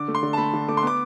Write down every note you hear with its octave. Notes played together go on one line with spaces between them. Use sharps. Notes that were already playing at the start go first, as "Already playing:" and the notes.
Already playing: D3 D6
A3
C6
D3
A5
A3 B5
D3
A3 D6
C6
B3 D6